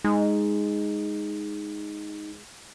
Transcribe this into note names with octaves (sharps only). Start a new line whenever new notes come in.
G#3 D#4